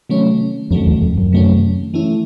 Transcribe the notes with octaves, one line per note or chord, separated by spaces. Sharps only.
C3 D#3 F#3 A3 C#4
F2 C3 D#3 F#3 A3 C#4
E2
F2
F#2
C3 D#3 F#3 A3 C#4
E3 A3 C#4 E4